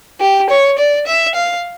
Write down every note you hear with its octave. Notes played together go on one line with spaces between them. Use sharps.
G4
C#5
D5
E5
F5